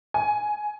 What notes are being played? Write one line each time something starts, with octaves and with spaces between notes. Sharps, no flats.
G#5